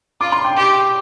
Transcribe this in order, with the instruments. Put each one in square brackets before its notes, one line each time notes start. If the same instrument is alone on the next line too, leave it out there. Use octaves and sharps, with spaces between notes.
[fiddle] F4 [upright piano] D6
[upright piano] C6
G5
[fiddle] G4